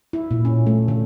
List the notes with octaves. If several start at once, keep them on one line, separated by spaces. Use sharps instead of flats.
E4
A#2
C#4
A3
D3